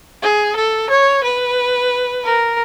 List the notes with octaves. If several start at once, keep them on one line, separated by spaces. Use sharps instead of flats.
G#4
A4
C#5
B4
A#4